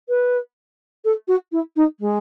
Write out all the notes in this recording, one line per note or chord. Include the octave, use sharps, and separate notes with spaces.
B4
A4
F#4
E4
D#4
G#3